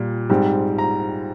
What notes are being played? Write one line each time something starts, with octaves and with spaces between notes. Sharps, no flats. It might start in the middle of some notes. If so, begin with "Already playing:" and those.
Already playing: A#2 G3
G#2 G3 C4
A#5